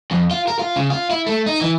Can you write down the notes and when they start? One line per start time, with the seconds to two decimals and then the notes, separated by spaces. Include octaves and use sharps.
0.11 F2
0.31 F4
0.48 A#4
0.59 F4
0.76 C#3
0.90 F4
1.10 E4
1.26 A3
1.46 D#4
1.61 E3